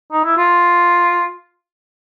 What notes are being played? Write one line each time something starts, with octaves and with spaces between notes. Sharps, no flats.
D#4
E4
F4